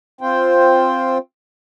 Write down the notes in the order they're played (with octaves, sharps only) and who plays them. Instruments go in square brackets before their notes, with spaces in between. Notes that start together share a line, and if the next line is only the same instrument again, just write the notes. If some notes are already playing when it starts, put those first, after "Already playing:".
[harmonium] C4 F4 C5 G5